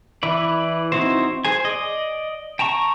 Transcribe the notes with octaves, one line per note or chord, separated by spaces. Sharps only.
E3 E4 B4 D5
C4 D#4 E4 F#4 C5
G#4 C5 G#5
D5 D#5
G5 A5 A#5 C#6